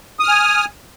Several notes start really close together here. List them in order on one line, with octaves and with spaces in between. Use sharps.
D#6 F6 G#5